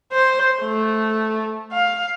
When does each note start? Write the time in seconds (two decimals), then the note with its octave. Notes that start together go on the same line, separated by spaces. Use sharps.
0.13 C5
0.61 A3
1.72 F5